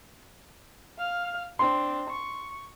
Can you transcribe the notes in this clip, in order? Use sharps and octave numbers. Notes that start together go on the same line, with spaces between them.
F5 F6
C4 D4 C6
C#6